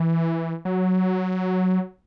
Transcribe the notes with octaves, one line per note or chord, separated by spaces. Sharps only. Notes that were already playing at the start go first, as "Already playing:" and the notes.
Already playing: E3
F#3